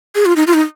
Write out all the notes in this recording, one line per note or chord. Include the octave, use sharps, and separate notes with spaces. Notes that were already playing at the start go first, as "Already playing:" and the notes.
G#4
F4
D#4
F4
D#4